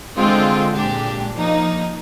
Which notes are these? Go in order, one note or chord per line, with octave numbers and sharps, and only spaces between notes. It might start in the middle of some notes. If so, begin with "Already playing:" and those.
D3 G#3 C4 F4
A#2 G#3 D4 G4
F3 A#3 D#4